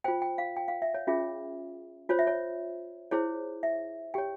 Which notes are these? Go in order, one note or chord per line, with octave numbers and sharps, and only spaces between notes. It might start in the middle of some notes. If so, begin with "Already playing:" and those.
F4 C5 G5
G5
F5
G5
F5
E5
C#5
C#4 F4 G#4 E5
F4 C5 C#5
E5
C#5
E4 G#4 C5 C#5
E5
G4 C#5 G5